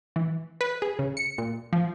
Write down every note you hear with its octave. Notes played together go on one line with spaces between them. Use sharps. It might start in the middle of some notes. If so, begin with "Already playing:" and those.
E3
B4
G#4
C#3
C#7
A#2
F3